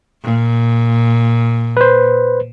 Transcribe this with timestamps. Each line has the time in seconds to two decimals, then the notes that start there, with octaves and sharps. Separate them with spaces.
0.24 A#2
1.77 B4 C5